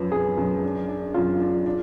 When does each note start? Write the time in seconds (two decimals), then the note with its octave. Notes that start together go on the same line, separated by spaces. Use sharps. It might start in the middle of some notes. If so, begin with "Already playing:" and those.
Already playing: F#2 F3 F#3 B4
0.12 F#2 G#4
0.38 F#2
0.63 D4
0.88 D4
1.14 F#2 F4
1.40 D4
1.66 D4